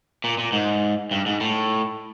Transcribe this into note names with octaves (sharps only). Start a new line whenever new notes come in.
A#2
A#2
G#2
G2
G#2
A2